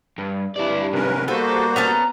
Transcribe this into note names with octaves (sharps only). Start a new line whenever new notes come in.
G2
G2 E4 D5
C3 D#3 C#4 A#4 B4
G3 A#3 B3 F#4 A4 C5
B3 C#4 A4 A#5